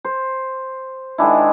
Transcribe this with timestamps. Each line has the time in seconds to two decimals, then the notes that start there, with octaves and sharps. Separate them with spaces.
0.04 C5
1.18 D#3 G#3 D4 E4